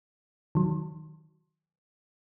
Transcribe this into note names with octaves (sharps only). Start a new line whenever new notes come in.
D#3 F#3